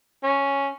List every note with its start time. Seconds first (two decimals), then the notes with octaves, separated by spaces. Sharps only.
0.24 C#4